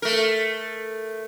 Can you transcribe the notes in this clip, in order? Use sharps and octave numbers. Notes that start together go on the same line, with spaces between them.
A3 A#4